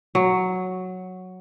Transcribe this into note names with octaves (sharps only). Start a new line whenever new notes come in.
F#3